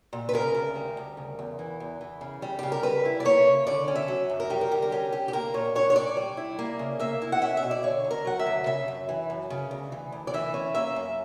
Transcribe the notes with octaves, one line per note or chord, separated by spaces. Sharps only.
A#2
B4
C#3 A#4
D2
G3
D2
C#3
E2
E3
E2
E3
C#3
G3
C#3 G4
A#4
G3 B4
E4
D5
A#3 C#5
C#3
D3 D5
C#4
E5
F#3
F#2
A#4
G3 G4
A#4
D3 G4
A#4
C#4 G4
D3 G4
G4
A#3 A#4
A#2 C#5
D4 C#5
C#5
A#2 D5
G3
E4
A#3
C#3
A#3 E5
E4
F#5
C#4 E5
E5
B2
D5
D3 C#5
D2
A#4
F#3 F#5
E5
D2
C#3 E5
F#2
E3
F#2
C#3
D2
E3
D2
D5
E3 E5
C#4
A#3 E5
F#2